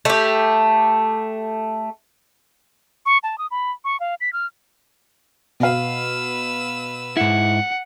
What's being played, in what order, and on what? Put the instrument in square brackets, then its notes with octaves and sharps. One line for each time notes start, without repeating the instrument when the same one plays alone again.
[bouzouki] A3 G4
[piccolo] C#6
A5
D#6
B5
C#6
F5
B6
F6
[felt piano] B2 F5 [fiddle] B4 E6
[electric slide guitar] G#2 E4 [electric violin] F#5